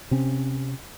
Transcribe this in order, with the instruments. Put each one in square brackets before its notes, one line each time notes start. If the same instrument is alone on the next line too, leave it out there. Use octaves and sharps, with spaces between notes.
[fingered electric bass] C3 C4 C#4